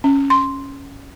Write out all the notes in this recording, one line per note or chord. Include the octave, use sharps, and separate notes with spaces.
C#4
C6